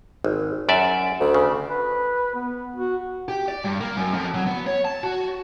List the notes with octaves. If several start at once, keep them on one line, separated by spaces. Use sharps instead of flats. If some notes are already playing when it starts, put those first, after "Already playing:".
G#1
F#2 D5 E5
D2
C#3
B4
B3
F#4
G4
D5
G2
A#3
F#2
F2
F#3
B3
C#5
A5
F#4